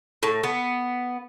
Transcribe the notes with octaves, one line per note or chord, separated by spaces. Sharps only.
A2
B3